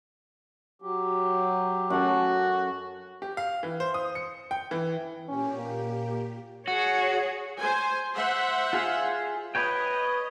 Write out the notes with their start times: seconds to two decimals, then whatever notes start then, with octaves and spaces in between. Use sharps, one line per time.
0.82 F#3 G4
1.90 F#2 F#4 A4
3.22 G4
3.37 F5
3.63 E3
3.80 C5
3.94 D#6
4.15 C#7
4.51 G5
4.71 E3
5.29 A#2 C#4 G4
5.57 A#3
6.68 F#4 G#4 C#5
7.58 C5 G#5
8.15 C5 E5 F#5
8.73 F4 G#4 F5
9.55 B4 C#5 D#5 G5